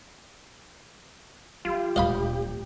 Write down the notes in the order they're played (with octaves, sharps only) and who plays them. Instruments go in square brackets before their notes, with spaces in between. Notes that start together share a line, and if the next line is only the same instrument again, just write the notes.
[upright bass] F#3 [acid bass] F4 [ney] G4
[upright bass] D1 A#2 [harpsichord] D#5 F5 B5